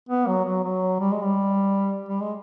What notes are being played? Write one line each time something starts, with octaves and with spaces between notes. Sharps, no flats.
B3
F#3
F#3
F#3
G3
G#3
G3
G3
G#3